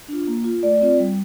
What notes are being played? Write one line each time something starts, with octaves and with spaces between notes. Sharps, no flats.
D4 F4
A#3
F4
A3 D5
C4 F4
G3